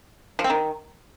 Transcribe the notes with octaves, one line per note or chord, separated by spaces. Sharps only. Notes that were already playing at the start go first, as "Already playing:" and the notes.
F3
C4
D#3